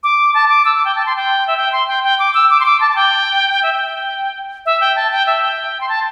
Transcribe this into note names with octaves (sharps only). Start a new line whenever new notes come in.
D6
A5
D6
E6
D6
G5
A5
C6
G5
E5
G5
C6
G5
G5
D6
E6
D6
C6
D6
A5
A5
G5
E5
G5
E5
G5
A5
G5
E5
G5
C6
A5